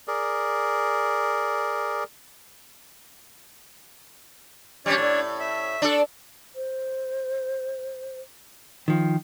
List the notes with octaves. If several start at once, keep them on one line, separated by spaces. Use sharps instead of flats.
G#4 A#4 D5
G3 C#4 D4 C#5 D5
A2
E5
D4 A4
C5
D#3 F3 G5